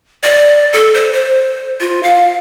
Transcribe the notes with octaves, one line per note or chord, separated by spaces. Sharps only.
D5
A4
C5
C5
F4
F5